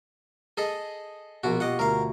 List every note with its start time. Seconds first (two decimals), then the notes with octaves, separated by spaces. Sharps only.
0.57 G#4 A4 D#5
1.44 A#1 B2 F#4
1.60 F4 G4 D#5 F#5
1.79 D2 A#4 F5